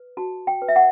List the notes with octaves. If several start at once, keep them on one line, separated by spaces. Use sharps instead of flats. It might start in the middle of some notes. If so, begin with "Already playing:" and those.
Already playing: B4
F#4 A5
G5
B4
E5
F#5